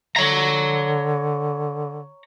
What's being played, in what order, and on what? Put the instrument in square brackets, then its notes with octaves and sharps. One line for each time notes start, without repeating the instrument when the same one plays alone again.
[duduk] D3 [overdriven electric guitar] C#5 A#5